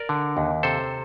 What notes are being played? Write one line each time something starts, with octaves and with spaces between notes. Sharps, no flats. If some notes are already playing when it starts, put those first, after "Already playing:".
Already playing: A#4 D5
D3
D#2
C3 A4 C5